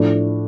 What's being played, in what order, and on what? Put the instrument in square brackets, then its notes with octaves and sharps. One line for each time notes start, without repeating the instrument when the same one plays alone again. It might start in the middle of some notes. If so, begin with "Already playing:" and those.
Already playing: [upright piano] A2 F3 D4